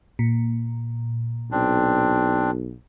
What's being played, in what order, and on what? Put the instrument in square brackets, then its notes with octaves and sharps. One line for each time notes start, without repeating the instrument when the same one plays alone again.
[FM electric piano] A#2
[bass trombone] B1 [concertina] C4 D4